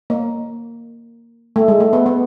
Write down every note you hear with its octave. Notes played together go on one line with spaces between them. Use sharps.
A#3
A3
G#3
A3
B3
B3